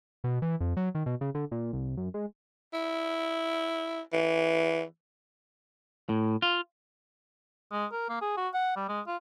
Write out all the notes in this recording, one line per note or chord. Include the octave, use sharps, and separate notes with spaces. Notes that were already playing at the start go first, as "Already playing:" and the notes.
B2
E3
F2
F#3
D#3
B2
C#3
D3
A#2
C2
F#2
G#3
E4
E3
A2
F4
G#3
A#4
A#3
G#4
F#4
F#5
G3
G#3
F4